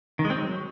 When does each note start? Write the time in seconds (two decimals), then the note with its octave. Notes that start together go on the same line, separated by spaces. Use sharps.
0.19 D#3
0.25 G#3
0.30 C4
0.36 F#3